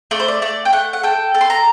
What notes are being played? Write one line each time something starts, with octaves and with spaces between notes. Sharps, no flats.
A3 D5
C5
D5
A3 D5
G5
A3 F#5
F#5
A4 G5
A4
C6
A#5